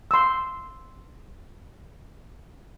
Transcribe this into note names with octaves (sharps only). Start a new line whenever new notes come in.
C6 E6